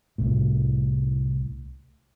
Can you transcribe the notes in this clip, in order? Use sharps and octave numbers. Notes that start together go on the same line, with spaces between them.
C2 A2